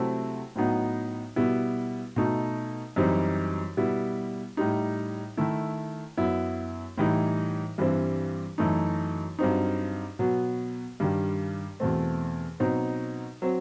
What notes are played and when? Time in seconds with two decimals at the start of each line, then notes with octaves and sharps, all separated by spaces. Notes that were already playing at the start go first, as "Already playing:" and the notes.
Already playing: C3 F#3 A3 C4 E4
0.56 A2 F#3 B3 D#4
1.36 B2 G3 B3 E4
2.16 B2 A3 D#4
2.96 F#2 E3 G3 C4 D#4
3.77 B2 G3 B3 E4
4.57 A2 G3 D#4
5.37 D#3 A3 E4
6.17 F#2 F#3 B3 E4
6.98 A2 E3 G3 D#4
7.78 G2 E3 G3 C4
8.58 F#2 E3 A3 D#4
9.39 G2 F#3 C4 D#4
10.19 B2 F#3 B3
11.00 G2 D#3 G3
11.80 E2 B2 A3 C4
12.60 B2 F#3 C4 D#4
13.42 F#3 C4